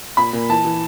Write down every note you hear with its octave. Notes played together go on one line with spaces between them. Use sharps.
A#2 B5
A#2
E3 A5
E3